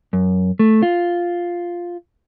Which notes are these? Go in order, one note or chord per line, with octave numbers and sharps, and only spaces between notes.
F#2
A3
F4